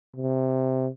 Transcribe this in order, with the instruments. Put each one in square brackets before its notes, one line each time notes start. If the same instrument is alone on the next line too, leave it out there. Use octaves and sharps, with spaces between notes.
[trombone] C3